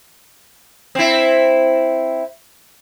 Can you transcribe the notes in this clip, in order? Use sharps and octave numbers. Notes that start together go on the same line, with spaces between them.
C4 E4